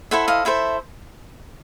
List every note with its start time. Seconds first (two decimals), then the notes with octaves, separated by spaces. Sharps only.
0.11 E4 A4 C5 E5 F#5
0.28 D#5 F5
0.45 E4 A4 C5 E5